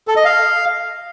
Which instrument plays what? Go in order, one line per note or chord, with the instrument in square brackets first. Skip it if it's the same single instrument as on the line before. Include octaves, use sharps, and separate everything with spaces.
[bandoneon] A4
D#5
F5